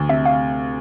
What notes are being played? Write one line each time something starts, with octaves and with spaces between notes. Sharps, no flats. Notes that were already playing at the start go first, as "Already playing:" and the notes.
Already playing: D2
C3 E5
F5